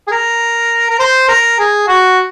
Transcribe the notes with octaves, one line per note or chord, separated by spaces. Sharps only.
G#4
A#4
A#4
C5
A#4
G#4
F#4